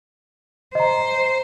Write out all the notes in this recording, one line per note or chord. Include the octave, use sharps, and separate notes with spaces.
C5 D#5 A#5